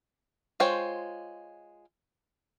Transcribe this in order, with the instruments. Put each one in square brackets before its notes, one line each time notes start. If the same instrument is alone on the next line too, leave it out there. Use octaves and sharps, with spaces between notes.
[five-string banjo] G#3 F4 C5 C#5 G5